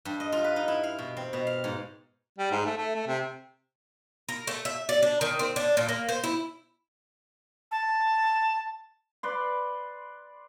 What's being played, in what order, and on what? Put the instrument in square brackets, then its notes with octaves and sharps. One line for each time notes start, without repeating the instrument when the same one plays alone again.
[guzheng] G2
D#5
F4
B4
D#4
E4
F5
B2
C4
B2
F5
G#2
[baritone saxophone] G3
G#2
A3
A3
A3
C3
[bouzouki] A#4
A3
E5
D5
D4
D#3
C4
D4
A#2
A#3
C5
E4
[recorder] A5
[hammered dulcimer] B4 D5 C6